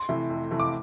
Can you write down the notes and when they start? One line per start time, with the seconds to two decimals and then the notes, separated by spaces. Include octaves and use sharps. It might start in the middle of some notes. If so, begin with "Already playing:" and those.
Already playing: C6
0.09 C3 E3 A3
0.30 F2
0.51 C3 E3 A3
0.60 D6